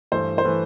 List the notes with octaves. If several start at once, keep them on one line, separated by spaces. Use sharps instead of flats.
G2 E3 A3 C5
C5
E3 A3 B4